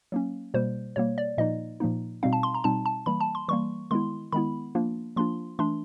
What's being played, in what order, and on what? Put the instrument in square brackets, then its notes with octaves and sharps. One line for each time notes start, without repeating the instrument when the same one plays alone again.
[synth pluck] F#3 A#3 C#4
B2 G3 A#3 C5
B2 G3 A#3 C#5
D5
A#2 F3 A#3 D#4 D#5
A#2 F3 A#3 D#4
B2 G3 C4 D#4 F5
A5
C6
A#5
B2 G3 C4 D#4 A5
A5
E3 G3 A#3 B5
A5
C6
E3 G3 A#3 C#6
D#3 G#3 B3 E4 C6
D#3 G#3 B3 E4 B5
F3 A#3 D4 F4
F3 A#3 D4 F4 C6
E3 A3 D4 C6